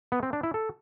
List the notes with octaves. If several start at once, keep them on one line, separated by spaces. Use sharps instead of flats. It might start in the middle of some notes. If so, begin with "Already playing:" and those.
B3
C4
D4
E4
A4